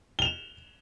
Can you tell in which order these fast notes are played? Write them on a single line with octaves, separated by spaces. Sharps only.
G7 F7 E7